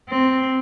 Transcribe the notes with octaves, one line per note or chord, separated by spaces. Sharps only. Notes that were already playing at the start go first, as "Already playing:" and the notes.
C4